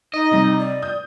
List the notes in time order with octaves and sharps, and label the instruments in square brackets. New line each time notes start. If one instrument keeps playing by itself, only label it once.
[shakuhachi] D#4 [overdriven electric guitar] D#5
[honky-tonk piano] C3 G3
[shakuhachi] D5
[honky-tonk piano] D#6 G6